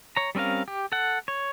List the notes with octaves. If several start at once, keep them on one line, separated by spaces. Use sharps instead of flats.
C#5 A#5
G3 C4 C#4 A#4 F5
G4
A4 F#5
C#5